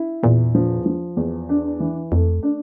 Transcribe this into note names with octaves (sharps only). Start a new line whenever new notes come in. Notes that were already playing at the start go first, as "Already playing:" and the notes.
Already playing: E4
E2 A#2
F3
F3
E2
D4
E3
F2 A3
D4